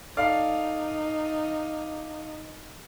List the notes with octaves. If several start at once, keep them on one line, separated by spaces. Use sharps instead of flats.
D#4 A4 D5 F5